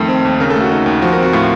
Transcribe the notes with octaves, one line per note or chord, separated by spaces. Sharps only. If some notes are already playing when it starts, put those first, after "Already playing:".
Already playing: F2 D#3 A3
C4
D#2
C#3 A#4
A4
A3 F#4
D#4 A4
D#2
F3 F#4
A#4
C4
F#4
A2 F4